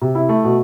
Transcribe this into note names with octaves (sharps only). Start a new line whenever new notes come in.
C3
E4
A3
B2